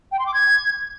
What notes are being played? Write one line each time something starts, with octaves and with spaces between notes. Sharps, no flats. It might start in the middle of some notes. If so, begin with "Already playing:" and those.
G5
C6
D6
G#6